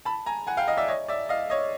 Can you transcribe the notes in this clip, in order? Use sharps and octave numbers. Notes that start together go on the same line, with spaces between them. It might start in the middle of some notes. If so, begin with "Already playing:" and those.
A5 B5
G#5 A#5
F#5 G#5
F5 G5
D#5 F5
D5 E5
C#5 D#5
D5 E5
D#5 F5
C#5 D#5